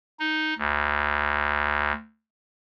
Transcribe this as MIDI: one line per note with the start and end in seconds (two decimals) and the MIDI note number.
0.20 0.54 63
0.58 1.93 38